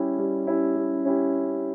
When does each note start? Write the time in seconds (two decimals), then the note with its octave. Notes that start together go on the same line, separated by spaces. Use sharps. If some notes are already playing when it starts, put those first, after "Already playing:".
Already playing: G3 C#4 E4 G4
0.18 G3
0.47 C#4 E4 G4
0.76 G3
1.05 C#4 E4 G4